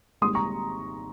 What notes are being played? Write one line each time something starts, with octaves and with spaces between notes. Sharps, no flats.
G#1 G#2 G3 A#3 C6 D#6
A#5 C#6